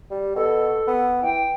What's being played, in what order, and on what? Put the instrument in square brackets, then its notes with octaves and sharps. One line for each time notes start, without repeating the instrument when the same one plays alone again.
[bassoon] G3
[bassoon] B2 [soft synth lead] A4
[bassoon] B3
[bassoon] E3 [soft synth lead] G5